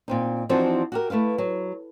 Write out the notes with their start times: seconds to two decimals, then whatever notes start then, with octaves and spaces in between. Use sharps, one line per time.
0.08 A#2 C4 D#4
0.49 E3 F3 C4 D4 D#4 F#4
0.92 F#4 G4 A#4
1.10 A3 E4 B4 F5
1.38 F#3